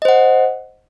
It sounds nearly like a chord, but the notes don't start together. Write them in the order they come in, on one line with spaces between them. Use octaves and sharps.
D#5 C5 F#5